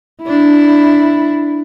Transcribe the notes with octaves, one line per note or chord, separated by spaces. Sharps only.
D4 E4